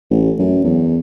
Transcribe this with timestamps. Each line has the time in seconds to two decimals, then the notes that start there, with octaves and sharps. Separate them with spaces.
0.11 A1
0.39 F#2
0.64 E2